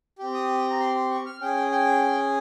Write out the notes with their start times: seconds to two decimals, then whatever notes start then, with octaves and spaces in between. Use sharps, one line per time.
0.19 C4 G4
0.34 D#6
0.70 A#5
0.80 C6
0.95 C6
1.11 C#6
1.26 F6
1.41 C#4 G#4 G5
1.72 G5